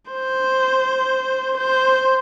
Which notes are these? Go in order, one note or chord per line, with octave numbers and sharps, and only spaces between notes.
C5
C5